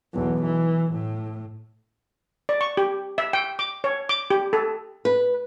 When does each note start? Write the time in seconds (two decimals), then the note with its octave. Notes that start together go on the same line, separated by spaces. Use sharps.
0.13 B1 E2
0.44 E3
0.92 A2
2.49 D5
2.61 C#6
2.77 G4
3.18 E5
3.33 G5
3.59 D6
3.84 C#5
4.09 D6
4.30 G4
4.53 A4
5.05 B4